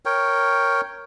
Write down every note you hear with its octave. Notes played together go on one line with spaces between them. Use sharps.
A#4 C#5 G5